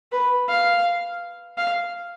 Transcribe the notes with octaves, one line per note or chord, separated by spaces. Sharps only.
B4
F5
F5